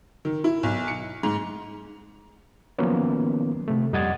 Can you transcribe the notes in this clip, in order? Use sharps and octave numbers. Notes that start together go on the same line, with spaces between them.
D#3
E4
B1
C#7
G#2
D#3 F3 F#3 A#3 B3 C#4
C3 A3
F2 G3 D#5 F#5 G#6 A6